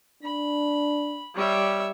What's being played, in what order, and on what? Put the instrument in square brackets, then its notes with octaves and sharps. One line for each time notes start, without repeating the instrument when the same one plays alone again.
[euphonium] D4 [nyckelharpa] B5
[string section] G3 [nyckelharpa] C#5 E5